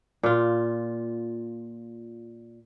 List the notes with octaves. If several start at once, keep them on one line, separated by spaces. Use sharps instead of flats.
A#2 F4